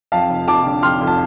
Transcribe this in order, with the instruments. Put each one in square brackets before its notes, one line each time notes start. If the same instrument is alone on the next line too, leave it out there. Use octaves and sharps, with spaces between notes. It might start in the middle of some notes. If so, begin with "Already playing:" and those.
[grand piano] F2 F5 A5
F1
F1 A5 D6
D3
F2 C6 F6
F1
A5